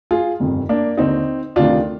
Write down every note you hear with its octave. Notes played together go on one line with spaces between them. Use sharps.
F4 G#4
G1 F2 C3 D#3
A#3 D4
D#2 D3 C4 D#4
D2 C3 D#3 D4 F4